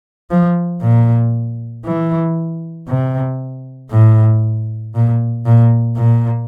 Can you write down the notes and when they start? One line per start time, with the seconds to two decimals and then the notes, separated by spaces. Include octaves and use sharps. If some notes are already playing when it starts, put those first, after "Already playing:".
0.30 F3
0.82 A#2
1.84 E3
2.88 C3
3.91 A2
4.95 A#2
5.46 A#2
5.97 A#2